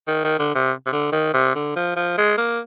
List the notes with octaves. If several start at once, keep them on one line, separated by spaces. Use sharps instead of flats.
D#3
D#3
D3
C3
C3
D3
D#3
C3
D3
F3
F3
G#3
A#3